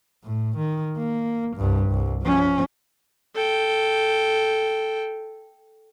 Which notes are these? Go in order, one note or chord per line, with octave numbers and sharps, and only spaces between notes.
A2
D#3
A#3
C2 G2
C2
F3 C#4
A4 G5